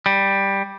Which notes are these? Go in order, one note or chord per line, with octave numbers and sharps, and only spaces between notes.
G3